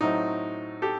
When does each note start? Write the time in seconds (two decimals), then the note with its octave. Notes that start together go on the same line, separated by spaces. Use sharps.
0.01 A2 F#3 A3 C4 D#4
0.82 G4 A4